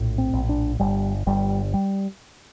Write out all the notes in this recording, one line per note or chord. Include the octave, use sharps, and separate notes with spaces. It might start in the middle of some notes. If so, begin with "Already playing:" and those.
Already playing: A#1 A2
C4
A#1
D4
G1 G3
G1 G3
G3